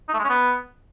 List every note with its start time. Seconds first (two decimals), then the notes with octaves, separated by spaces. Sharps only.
0.09 D#4
0.14 A3
0.19 G#3
0.24 C#4
0.29 B3